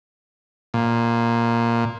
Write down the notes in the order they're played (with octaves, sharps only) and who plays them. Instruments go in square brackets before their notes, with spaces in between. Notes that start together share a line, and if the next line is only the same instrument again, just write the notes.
[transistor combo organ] A#2